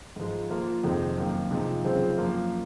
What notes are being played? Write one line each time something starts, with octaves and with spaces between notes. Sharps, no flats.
G#2 F3 G#3
F3 A#3 F4
F2 C3 D#3 G#3 C4
F#2 D#3 A#3
C3 F3 G#3 D#4
F#2 C#3 F3 G#3 C4
F#2 F3 A#3